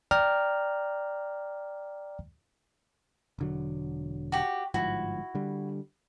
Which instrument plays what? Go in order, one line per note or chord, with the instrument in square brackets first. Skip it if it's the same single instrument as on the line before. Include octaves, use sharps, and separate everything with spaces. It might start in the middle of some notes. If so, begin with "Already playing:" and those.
[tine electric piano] D5 G5 A#5 F6
[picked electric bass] E1 D3 F#3
[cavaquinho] F#4 G4
[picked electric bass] G1 G#2 F3 [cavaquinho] E4 F#4
[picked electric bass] D3 G3